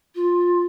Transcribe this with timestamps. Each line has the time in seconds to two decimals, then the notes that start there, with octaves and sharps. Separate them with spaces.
0.15 F4